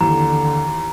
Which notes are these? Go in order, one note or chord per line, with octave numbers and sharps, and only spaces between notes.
D#2 D3 E3 A#5